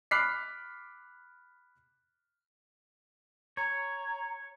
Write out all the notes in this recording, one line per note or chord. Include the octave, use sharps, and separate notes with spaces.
B5 D6 F6 F#6 B6 C7
C#5 A#5